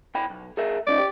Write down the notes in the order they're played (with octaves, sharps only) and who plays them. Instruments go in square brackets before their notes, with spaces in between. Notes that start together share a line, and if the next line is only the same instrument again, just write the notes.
[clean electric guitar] B2 G5 B5
B1
G#4 A#4 E5
[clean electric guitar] G2 C#4 D#4 [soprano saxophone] D5
[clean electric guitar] G4